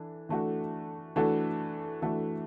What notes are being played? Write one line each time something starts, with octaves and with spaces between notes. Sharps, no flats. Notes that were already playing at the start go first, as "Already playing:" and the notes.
Already playing: E3 D4 A4
E3 A3 D4 F#4 A4
E3 A3 D4 F#4 A4
E3 A3 D4 F#4 A4